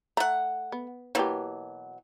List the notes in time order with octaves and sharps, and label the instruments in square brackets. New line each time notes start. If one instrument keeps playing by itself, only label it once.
[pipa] A3 F#5 [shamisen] A#5
[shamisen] B3
[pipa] B2 E3 F#3 [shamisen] A#3 G4